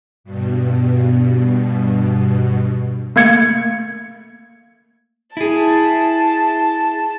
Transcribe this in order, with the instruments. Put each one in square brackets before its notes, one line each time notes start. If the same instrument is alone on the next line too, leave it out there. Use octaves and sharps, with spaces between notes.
[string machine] G2 B2
[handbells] A3 A#3 G#6 C#7
[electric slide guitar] E4 G#4 [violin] A5